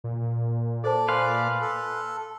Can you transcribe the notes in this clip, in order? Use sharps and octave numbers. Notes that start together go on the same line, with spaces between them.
A#2
A4 C5 D5 A5
B4 F5 G#5 C6
A4